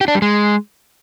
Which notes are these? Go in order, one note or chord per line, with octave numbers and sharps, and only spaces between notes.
G4
D4
G3
G#3